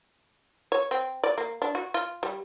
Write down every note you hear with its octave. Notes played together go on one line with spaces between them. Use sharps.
C#5
C4
D5
A#3
D4
F#4
F4
G3